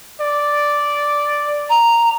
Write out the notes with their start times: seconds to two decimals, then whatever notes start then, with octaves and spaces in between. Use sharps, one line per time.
0.21 D5
1.69 A#5